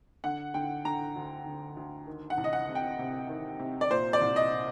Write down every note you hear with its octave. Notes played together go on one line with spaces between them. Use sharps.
D3 F#5
D3 G5
D3 A#5
D2
D3
D2
D#3
F#5
C2
D#5
F#5
C3
G5
C3
D#3
C3
D5
A#2 C5
D5
C2
D#5